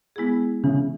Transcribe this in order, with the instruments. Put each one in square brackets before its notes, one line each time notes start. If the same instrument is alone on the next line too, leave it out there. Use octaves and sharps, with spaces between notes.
[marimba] G#3 B3 E4 G#4
[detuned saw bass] C#3 [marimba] E3